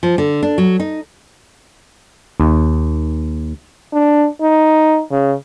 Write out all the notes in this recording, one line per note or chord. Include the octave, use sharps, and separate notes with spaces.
F3
D3
D4
F#3
D#4
D#2
D4
D#4
C#3